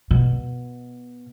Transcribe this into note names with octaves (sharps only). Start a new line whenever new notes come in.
B2